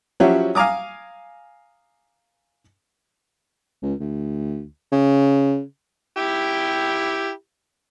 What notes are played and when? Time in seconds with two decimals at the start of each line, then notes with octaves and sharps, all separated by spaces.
0.20 F3 F#3 C#4 E4 F#4 G4
0.55 F5 G#5 A#5 D6 D#6
3.83 C#2
4.00 D2
4.92 C#3
6.17 E4 G4 G5